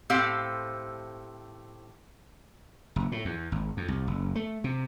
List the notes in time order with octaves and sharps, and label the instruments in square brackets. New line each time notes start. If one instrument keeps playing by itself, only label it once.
[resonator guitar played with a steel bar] A2 C4 G4 A4 C5 F5
[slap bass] F#1
A2
E2
G#1
F2
C2
F#1
A3
C3